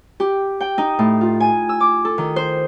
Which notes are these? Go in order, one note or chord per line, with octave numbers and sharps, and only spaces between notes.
G4
G5
D#4
A2
F4
G#5
E6
D6
A4
D#3
C5